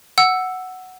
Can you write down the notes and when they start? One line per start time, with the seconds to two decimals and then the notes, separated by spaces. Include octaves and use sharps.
0.18 F#5 E6